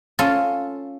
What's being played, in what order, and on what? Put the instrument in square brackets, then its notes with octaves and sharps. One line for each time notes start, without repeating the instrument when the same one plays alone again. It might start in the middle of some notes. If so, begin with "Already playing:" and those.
[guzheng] C#4 F4 A4